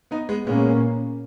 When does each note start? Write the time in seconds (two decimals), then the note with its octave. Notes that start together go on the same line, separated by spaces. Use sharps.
0.11 B3 D#4
0.29 G#3 B3
0.47 A#2 G#3 A#3 B3 C#4